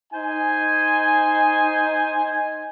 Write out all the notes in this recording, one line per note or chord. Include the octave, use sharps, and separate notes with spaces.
D#4 C5 G#5